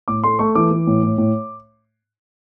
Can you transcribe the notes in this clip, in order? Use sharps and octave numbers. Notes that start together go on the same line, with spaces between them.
A2 D6
A3 C6
A3 C#6
E3 D6
E3
A2
A2
A2